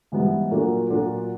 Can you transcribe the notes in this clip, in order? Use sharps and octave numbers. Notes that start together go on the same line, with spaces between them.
G#2 E3 G3 B3
A#2 F#3 A#3 D4 F4
A#2 F#3 A#3 D4 F4